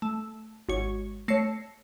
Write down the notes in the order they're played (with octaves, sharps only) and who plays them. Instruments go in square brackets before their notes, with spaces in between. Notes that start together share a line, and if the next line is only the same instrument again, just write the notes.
[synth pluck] A3
[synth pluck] G#1 C#5 [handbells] F#4
[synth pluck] A3 C7 C#7 [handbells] C#5 A#6